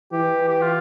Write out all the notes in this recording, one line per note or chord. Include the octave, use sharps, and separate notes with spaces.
E3 G4
G4
F4